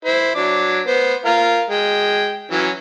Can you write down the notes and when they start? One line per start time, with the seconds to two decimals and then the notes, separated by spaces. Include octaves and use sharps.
0.05 E4 C5
0.35 F#3 D4 D6
0.87 B3 C5
1.25 F4 A#4 F5
1.70 G#3 G5
2.51 E3 F#3 C#4